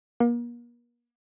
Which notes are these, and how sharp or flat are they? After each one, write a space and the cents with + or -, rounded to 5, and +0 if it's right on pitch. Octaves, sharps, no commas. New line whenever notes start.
A#3 +40